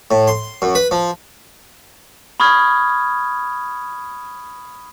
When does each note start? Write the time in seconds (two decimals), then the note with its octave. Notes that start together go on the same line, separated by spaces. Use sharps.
0.11 A2
0.28 C6
0.62 F#2
0.75 B4
0.91 F3
2.40 B5 C#6 D#6 F6 G#6